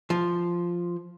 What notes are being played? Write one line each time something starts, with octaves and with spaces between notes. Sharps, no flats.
F3